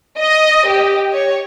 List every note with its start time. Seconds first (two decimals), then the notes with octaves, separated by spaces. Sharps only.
0.18 D#5
0.67 G4
1.13 C#5